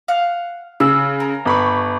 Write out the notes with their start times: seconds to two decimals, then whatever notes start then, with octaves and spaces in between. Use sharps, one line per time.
0.08 F5 F#5
0.80 C#3 E6
1.20 A#4
1.45 G1 B5 C#6